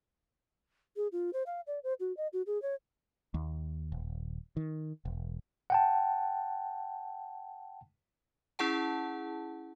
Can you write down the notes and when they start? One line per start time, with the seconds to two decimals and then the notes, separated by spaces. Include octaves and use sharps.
0.96 G#4
1.12 F4
1.33 C5
1.46 F5
1.67 D5
1.83 C5
2.00 F#4
2.17 D#5
2.33 F#4
2.46 G#4
2.62 C#5
3.34 D#2
3.92 D#1
4.57 D#3
5.05 E1
5.70 F#5 G5 A5
8.59 C#4 E4 G#4 F#5 A5